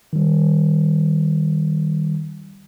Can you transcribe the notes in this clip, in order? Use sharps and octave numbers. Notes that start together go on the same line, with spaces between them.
D#3 G3